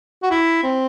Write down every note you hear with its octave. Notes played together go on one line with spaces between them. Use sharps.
F#4
E4
C4